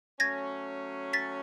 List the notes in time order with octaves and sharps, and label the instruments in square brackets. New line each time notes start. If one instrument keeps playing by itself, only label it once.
[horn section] F#3 A3 C#4 [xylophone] G#6 A#6
[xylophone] A6 B6